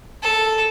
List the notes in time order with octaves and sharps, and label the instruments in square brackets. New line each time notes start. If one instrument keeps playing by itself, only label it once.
[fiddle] A4